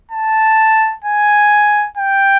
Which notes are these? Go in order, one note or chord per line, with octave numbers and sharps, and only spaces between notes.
A5
G#5
G5